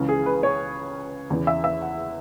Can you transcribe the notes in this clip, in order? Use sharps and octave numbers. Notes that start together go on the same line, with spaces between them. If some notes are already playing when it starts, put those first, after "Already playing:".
Already playing: C#2 C#3 E3
G#4
B4
C#5
E2 C#3 E3
E5
E5
F#5